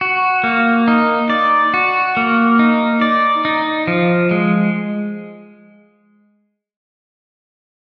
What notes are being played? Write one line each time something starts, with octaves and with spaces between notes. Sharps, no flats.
F#4
A#3
D#4
D5
F#4
A#3
D#4
D5
D#4
F3
G#3